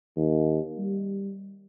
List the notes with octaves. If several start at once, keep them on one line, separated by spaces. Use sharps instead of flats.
D#2
G3